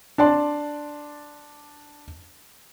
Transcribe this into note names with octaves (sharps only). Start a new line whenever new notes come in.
D4 D5 A5 C6